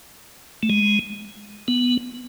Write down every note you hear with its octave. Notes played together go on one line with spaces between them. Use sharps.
A3
G#3
B3